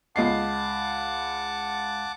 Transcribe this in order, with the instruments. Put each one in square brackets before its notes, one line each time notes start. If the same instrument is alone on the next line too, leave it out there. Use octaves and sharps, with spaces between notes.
[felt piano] C#2 D#5 C7 [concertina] F#5 A5 D6